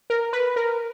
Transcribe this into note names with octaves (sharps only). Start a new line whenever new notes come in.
A#4
B4
A#4